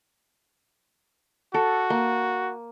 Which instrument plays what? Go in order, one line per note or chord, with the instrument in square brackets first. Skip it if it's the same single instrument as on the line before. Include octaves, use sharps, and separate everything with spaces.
[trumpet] F#4 [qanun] A4
[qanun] A#3